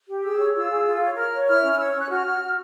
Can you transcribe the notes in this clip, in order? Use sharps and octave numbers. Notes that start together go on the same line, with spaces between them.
G4
G#4 E6
C#5
F4 E6
G#4
F4
C#5
A#4 F6
C#5
E4 F6
C#4
F6
C#5 E6
C#4
F#6
F#4 F6
F#4
F#4